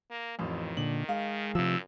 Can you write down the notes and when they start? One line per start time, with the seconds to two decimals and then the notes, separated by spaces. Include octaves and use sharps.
0.10 A#3
0.39 A1 F2 D#3
0.77 A#2 D3 F#7
1.09 G#3 F5
1.55 F#2 C3 F3 E6